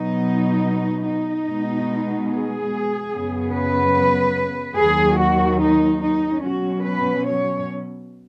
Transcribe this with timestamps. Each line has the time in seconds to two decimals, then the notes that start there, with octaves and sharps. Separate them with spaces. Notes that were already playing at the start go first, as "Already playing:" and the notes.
Already playing: B2 F#3 B3 D#4
1.06 D#4
1.48 B2 G#3 B3
2.30 G#4
3.13 F#2 C#3 B3
3.53 B4
4.77 D#2 D#3 F#3 G#4
5.18 F#4
5.60 D#4
6.01 D#4
6.43 B2 F#3 C#4 F#4
6.83 B4
7.25 C#5